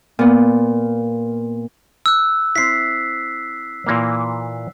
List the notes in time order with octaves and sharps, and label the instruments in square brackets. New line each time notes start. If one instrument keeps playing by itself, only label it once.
[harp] A#2 B3
[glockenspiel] E6 F#6
[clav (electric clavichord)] C4 E4 [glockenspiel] B6 C7
[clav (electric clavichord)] A#2 E3 A#3